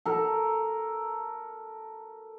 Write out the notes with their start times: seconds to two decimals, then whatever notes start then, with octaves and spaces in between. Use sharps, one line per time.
0.06 A4 A#4